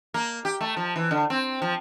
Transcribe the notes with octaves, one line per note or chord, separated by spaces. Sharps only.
A#3
G4
A3
F3
E3
D3
C4
F3